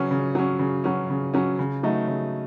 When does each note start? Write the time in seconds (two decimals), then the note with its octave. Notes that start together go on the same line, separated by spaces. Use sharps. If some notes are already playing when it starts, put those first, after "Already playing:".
Already playing: C#3 F#3 C#4
0.11 C#3
0.35 F#3 C#4
0.59 C#3
0.84 F#3 C#4
1.10 C#3
1.34 F#3 C#4
1.59 C#3
1.83 F#3 A3 D#4
2.07 C#3